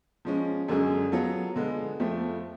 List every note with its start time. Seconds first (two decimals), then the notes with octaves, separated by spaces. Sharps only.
0.25 F3 G#3 C#4
0.68 F#2 D3 G#3 C#4 G#4
1.12 F#3 B3 F4 A4
1.56 D3 G#3 B3
1.99 F2 F3 A3